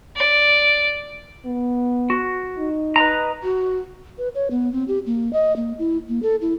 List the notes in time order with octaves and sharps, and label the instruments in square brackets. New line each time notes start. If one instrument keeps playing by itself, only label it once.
[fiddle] D5
[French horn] B3
[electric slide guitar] F#4
[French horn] D#4
[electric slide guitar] B4 D#5 A#5
[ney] F#4
[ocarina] B4
C#5
B3
C4
G4
A#3
D#5
A#3
E4
A#3
A4
E4